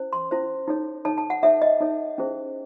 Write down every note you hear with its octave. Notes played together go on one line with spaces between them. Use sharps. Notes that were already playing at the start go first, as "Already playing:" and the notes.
Already playing: C#4 E4 C5
C6
C#4 E4 C5
D#4 A4 C#5
D#4 A4 C#5 A5
A5
F#5
D#4 A4 C#5 E5
D#5
D#4 A4 C#5
C#4 E4 G#4 C5